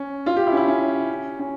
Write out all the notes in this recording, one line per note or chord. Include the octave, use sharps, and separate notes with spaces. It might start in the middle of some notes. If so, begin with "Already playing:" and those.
Already playing: C#4
F4
G4
E4
C#4
E4
C#4
C#4